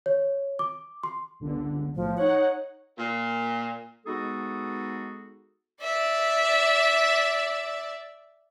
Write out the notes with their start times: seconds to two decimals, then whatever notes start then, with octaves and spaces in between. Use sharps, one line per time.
0.06 C#5
0.59 D6
1.03 C6
1.40 G1 C#2 D3
1.95 B1 A2 F3
2.17 D#4 C#5 F#5
2.97 A#2
4.06 G#3 B3 D#4 F#4 G#4 A4
5.82 D5 E5